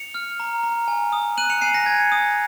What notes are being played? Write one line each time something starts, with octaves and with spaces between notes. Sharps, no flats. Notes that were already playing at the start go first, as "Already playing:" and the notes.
Already playing: C#7 F7
F6
A#5
A#5
G#5
D#6
F#6 D#7 F#7
C#7 F7
G#5 C7 D#7
A#6 C#7
G#5 G#6
D#6